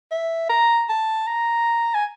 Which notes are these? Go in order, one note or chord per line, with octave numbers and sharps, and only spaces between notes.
E5
A#5
A5
A#5
G#5